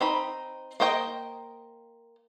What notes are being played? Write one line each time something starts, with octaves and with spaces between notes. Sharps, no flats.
C4 D#4 B5
A#3 C5 D#5 G5